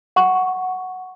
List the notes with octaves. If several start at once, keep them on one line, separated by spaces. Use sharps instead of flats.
F#5 C#6